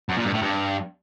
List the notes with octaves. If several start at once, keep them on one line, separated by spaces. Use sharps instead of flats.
F#2
A#2
G2
A2
G2